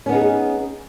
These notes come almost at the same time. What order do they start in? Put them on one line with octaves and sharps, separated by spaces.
C#4 B3 D#4 G#4